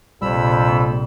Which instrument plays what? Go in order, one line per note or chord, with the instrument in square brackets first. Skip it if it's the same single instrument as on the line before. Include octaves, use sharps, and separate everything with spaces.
[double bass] A#1 C3 [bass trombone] F2 [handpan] G3 [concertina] B5 E6